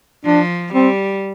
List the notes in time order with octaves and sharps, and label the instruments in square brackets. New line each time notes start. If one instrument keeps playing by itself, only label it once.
[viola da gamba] F3 [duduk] D4
[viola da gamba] G3 [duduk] C4